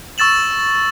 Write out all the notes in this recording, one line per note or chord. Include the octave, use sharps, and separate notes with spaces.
C#6 E6 A6 E7 F#7